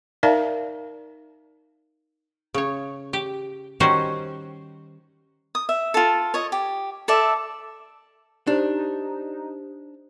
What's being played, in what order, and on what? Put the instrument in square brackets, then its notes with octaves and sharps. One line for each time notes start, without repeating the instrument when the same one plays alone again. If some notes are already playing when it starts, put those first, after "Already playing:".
[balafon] D#4 A#4 D5 E5 F5 A5
[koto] C#3 C#5
G4
D#3 G3 C#4 D#4 F#4 C5
[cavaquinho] D#6
E5
F4 A4
C#5 D#5
G4
A4 D5 E5
[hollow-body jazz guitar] D4 [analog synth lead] D#4 [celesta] G4 C5